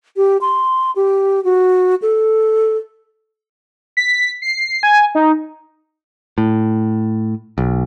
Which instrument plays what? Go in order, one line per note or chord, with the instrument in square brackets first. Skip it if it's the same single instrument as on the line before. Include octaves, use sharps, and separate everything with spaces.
[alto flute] G4
C6
G4
F#4
A4
[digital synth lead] B6
C7
G#5
D#4
[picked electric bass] A2
B1